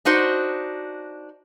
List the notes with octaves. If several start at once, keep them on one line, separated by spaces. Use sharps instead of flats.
D4 D#4 F#4 C5